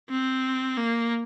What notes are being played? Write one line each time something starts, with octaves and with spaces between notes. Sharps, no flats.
C4
A#3